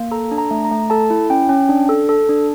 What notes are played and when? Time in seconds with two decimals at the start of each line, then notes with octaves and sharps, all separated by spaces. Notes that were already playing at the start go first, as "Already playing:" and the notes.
Already playing: A#3
0.11 A4 A#5
0.31 D4
0.38 A#5
0.51 A3
0.65 A#5
0.71 A3
0.90 A4 A5
1.10 E4
1.30 C#4 G5
1.49 C#4
1.69 D4
1.89 A4
2.09 A4
2.29 D4